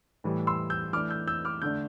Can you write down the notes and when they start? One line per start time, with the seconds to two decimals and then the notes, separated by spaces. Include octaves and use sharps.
0.24 A2 E3 G3
0.47 C6 E6
0.70 E6 G6
0.93 E3 A3 D4 D6 F6
1.10 E6 G6
1.27 E6 G6
1.45 D6 F6
1.62 D3 A3 D4 E6 G6